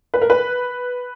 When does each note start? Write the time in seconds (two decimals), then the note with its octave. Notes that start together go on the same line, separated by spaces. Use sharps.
0.14 B4
0.21 A#4
0.30 B4